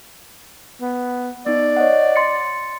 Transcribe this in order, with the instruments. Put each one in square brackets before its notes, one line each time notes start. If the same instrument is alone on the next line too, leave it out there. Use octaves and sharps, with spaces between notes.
[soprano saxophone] B3
[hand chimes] B3 D#4 [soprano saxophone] D5
[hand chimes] C#5 D#5 F#5
C6 A6 C#7